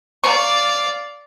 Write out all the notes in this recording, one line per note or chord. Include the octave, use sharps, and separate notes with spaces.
D5 F5 A#5 C#6